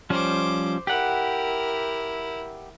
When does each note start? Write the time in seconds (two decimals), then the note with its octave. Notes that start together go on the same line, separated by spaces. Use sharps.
0.10 F3 G3 C#4 C5 D6
0.87 E4 G4 A#4 F#5